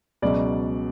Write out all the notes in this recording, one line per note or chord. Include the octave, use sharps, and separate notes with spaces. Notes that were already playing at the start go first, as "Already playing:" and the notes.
C#2 B2 F#3 D5